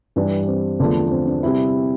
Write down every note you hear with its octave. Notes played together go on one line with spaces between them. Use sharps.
G2 E3 G3 D4
C4
E2 D3 F3 A3
C4
D4
C3 G3 E4